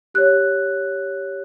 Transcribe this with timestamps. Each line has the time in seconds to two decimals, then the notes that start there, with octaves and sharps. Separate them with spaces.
0.14 G4 C#5 F#6